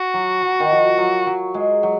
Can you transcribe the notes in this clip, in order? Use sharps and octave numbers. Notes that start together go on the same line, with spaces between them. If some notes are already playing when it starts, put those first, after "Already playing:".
Already playing: F#4
F#3
F#3
D#3
F3
F#3
F#3
G#3
F#3